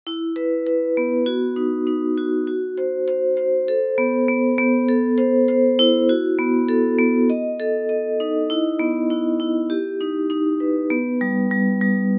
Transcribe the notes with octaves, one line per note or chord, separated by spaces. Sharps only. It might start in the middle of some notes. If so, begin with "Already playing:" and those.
E4
B4
B4
B3
F#4
D#4
D#4
F#4
F#4
C5
C5
C5
A4
B3
B3
B3
A4
C5
C5
E4
F#4
B3
A4
B3
D#5
A4
D#5
D#4
E4
B3
E4
E4
G4
D#4
D#4
B4
B3
G3
G3
G3